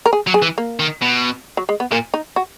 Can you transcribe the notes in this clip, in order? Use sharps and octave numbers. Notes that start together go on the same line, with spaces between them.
A#4
G#4
F#3
G#4
E3
A#3
D#3
B2
F#3
G#3
B3
A#2 A#3
D#4
F#4